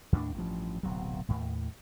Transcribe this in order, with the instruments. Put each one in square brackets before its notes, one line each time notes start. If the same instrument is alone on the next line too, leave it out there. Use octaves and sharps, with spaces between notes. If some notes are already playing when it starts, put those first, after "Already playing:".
[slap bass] D#2 A2 A#3 D4
A1 G2 F3
D1 B1 C3 F#3
D#2 A2